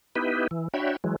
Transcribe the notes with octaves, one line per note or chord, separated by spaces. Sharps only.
B3 D#4 E4 G4 B4
E3
D4 F#4 C#5 E5 G5 B5
E3 F#3 G#3